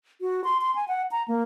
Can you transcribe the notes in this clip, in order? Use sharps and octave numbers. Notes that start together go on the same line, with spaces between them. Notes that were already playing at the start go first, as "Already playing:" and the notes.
F#4
C6
C6
G#5
F#5
A#5
A#3